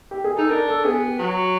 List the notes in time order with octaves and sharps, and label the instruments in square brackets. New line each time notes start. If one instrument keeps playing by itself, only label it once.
[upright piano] G4
G#4
[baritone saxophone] D#4 [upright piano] A4
[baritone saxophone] D4 [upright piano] A#4
[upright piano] A4
[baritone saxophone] B3 [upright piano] G#4
[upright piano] G4
[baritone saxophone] F#3 [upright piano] F#4